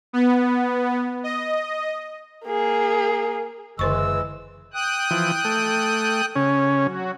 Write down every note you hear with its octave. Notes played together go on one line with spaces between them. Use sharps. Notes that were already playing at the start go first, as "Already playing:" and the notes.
B3
D#5
A#3 G#4
F#1 D3 E3 G#3 C5 C#6 E6
G5 D#6 F#6
E3 F3
A3
C#3 C#4
F#3 F#4